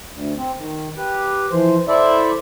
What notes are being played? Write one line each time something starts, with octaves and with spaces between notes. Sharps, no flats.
D2
C4
D#3
G4 B4
E3 F3 C5
E4 A4 C5 D5 E5